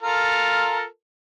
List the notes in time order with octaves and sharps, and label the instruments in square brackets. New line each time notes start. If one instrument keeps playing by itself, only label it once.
[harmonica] F4 A4 A#4